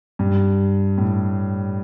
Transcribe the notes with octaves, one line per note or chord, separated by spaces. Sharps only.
G2
A2